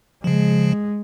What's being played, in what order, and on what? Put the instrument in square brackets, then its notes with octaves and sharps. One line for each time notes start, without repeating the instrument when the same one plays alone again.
[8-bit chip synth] C#3 F3 [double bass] G#3